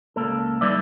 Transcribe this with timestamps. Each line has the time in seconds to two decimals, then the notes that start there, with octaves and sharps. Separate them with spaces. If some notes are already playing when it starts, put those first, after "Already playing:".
0.16 C#2 A#3 A4
0.61 G3 D#4 B4 D5 E5